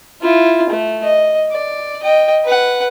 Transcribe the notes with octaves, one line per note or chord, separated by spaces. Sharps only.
E4 F4
A3
D#5
D5
D#5 G5
B4 F#5